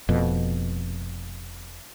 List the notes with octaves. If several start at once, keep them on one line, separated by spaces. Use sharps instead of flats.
F1 F2 B2